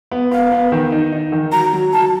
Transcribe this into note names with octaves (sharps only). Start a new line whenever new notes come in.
B3
B3 F5
B3
D#3
D#4
D#4
D#3
F#3 A#5
F#3
F#3 A5